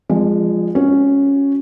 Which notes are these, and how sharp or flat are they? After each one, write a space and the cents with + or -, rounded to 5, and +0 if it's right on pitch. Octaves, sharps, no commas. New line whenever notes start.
F3 +0 G#3 -15 D5 +25
C#4 +0 F#4 +0